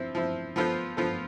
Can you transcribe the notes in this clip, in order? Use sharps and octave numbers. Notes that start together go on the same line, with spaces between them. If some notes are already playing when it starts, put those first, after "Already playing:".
Already playing: F3 C4 E4
F3 C4 E4
F3 B3 F4 A4 C5
F3 B3 F4 A4 C5